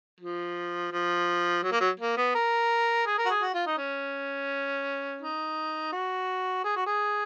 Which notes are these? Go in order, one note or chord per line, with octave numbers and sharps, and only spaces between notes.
F3
F3
F#3
A#3
F#3
A#3
B3
A#4
G#4
A#4
F#4
G#4
F#4
F4
D#4
C#4
D#4
F#4
G#4
F#4
G#4